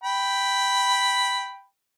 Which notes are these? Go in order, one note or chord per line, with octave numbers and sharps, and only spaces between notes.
G5 B5